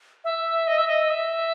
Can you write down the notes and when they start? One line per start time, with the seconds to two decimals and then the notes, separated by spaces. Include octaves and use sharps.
0.24 E5
0.67 D#5
0.78 E5
0.88 D#5
1.10 E5